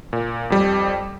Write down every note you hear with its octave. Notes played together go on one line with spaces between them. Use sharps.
A#2
F2 G3